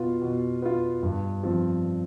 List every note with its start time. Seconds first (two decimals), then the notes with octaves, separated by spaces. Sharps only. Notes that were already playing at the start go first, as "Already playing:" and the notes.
Already playing: B2 B3 F4
0.22 B2
0.62 B3 F4
1.03 G2
1.43 F3 C4